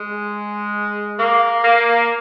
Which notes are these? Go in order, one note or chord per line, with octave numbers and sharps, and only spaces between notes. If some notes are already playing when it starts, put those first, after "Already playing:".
Already playing: G#3
A#3
A#3